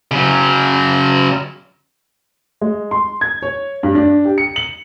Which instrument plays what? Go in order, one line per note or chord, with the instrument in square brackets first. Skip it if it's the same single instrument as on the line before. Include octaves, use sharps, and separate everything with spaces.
[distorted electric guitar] C#3 F#3
[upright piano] G#3
C6
G#6
C#5
G2
D4
G4
C#7
F#7